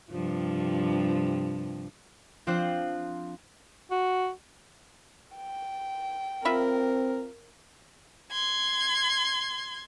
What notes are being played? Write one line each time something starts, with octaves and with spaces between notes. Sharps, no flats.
G2 C3 F3
F3 C4 D4 F4 C5 F#6
F#4
G5
C4 F4 A#4 E5 B5
C6 G#6